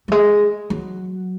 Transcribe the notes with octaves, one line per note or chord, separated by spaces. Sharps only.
F#3
G#3
F#3